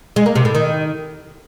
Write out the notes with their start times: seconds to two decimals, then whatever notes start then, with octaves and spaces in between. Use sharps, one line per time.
0.16 G#3
0.26 A#3
0.35 C3
0.45 A2
0.55 D#3